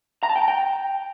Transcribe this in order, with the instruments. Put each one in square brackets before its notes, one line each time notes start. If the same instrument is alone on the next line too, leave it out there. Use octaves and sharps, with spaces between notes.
[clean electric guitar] A#5
A5
G5
A#5
G5